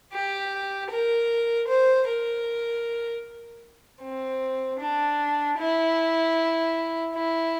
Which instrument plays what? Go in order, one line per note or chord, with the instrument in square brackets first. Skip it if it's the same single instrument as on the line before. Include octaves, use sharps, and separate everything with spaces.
[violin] G4
A#4
C5
A#4
C4
D4
E4
E4